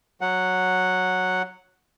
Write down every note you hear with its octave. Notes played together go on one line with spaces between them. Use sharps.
F#3 F#5